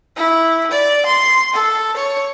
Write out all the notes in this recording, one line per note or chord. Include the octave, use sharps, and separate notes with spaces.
E4
D5
C6
A4
C#5